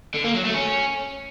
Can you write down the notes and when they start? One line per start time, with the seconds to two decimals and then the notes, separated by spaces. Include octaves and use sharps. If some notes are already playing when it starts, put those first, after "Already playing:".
0.14 D3
0.24 A#3
0.34 F#3
0.44 A3
0.54 C#4